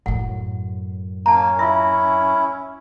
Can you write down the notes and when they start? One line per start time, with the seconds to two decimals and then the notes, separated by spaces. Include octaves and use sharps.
0.06 F#2 A2 F#5
1.26 A#3 C#4 A5 A#5
1.59 E4 F4 E5